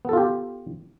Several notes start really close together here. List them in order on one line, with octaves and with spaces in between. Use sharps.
B3 A4 F4 G4